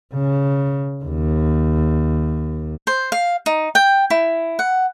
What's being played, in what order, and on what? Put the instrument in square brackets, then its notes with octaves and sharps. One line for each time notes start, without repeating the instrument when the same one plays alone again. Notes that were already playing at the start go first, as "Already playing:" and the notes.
[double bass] C#3
D#2
[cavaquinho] C5
F5
D#4
G5
E4
F#5